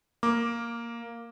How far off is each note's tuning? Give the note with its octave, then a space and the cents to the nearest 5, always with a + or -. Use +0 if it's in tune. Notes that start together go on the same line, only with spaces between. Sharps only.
A#3 +0 D6 +0